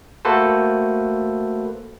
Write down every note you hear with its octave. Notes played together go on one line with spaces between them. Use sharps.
A3 A#3 F#4 A4 B4 C5